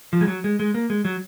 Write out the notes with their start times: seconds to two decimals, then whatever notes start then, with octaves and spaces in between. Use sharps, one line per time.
0.13 F3
0.21 G#3
0.28 F#3
0.44 G#3
0.60 G#3
0.74 A#3
0.90 G#3
1.05 F#3